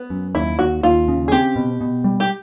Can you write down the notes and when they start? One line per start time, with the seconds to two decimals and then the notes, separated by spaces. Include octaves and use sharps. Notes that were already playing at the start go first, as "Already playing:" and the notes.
Already playing: B3
0.10 F#2
0.35 D#2 E4
0.59 D#2 F#4
0.83 D#2 F4
1.08 C#3
1.28 G#4
1.32 C4 G4
1.56 B2
1.81 B2
2.04 G3
2.20 G4